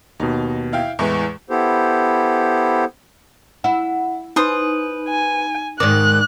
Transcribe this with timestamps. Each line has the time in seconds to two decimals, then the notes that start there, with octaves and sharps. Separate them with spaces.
0.20 D#2 B2 D#4
0.73 E4 F5 G5
0.99 E2 A2 E3 G#3 B4 C#6
1.50 B3 E4 G4 A4 C5
3.64 E4 F#5
4.36 D#4 B4 C5 D#6
5.09 G#5
5.80 G#2 D#3 D5 F#6